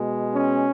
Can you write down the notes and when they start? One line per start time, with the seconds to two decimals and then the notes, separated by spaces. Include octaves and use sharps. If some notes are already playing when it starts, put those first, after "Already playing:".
Already playing: B2 G#3
0.33 C#4